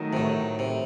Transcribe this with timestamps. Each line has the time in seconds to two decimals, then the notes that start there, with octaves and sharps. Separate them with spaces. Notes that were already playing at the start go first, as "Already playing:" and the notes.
Already playing: D#3 F#3 A3
0.13 C3
0.17 A2
0.59 C3